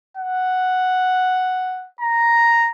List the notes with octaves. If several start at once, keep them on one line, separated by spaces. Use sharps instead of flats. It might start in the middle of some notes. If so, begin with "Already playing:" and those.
F#5
A#5